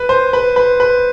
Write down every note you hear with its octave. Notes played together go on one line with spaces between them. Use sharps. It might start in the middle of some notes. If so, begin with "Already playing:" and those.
Already playing: B4
C5
B4
B4
B4